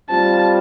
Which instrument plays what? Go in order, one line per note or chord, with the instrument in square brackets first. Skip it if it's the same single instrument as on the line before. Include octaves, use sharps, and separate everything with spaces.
[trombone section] G3 C4 F4 [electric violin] A5